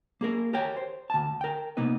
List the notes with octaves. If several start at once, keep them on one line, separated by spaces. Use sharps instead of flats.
A#3 G#4 A#4
G4 A#4 C#5 G5
C5
D2 A5
A#4 G5
C3 A#3 B3 D#4 B4